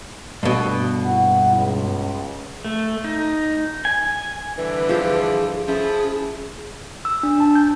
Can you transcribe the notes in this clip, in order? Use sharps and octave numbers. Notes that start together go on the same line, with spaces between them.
G2 B2 A3
A#1 E4 F#5
C#2
A3
D#4
G#5
G2 D3 E3 B4
F3 G4 G#4
F3 A3 C#4 E4 G#4
E6
D4
A5
G6